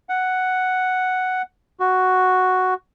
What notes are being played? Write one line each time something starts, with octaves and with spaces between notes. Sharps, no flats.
F#5
F#4